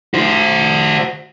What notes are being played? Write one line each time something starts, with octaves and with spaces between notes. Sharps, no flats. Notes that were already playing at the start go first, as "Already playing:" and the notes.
F#4 C5